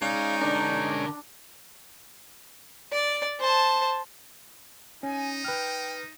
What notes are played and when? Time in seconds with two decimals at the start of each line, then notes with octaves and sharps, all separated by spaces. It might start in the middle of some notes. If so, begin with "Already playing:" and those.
0.02 G#3 C#4 D#4 G#4 D5 F5
0.41 D3 D4 A#4
2.93 D5
3.40 C5 A5
5.03 C#4 D#4 G#5
5.45 B4 G5 F6